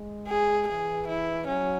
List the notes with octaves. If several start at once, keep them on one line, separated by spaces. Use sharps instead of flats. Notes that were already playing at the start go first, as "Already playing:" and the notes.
Already playing: G#3
G#4
E3 G#4
E4
F#3 C#4